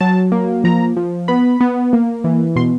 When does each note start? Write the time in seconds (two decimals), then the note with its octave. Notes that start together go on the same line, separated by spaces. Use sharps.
0.01 F#3 A5
0.32 A#3
0.64 F3 A#5
0.97 F3
1.28 B3 B5
1.60 B3
1.93 A#3
2.24 E3
2.56 B2 C6